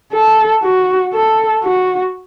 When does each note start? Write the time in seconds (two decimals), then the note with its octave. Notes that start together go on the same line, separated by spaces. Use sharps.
0.13 A4
0.63 F#4
1.13 A4
1.63 F#4